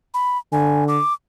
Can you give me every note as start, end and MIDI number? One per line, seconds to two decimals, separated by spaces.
0.14 0.38 83
0.52 0.99 50
0.52 0.84 80
0.88 1.13 86